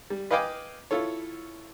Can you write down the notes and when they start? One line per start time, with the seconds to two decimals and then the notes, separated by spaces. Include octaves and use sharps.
0.10 G3
0.31 B4 D#5 F5 G5 G#5 D6
0.91 E4 F4 A4 C#5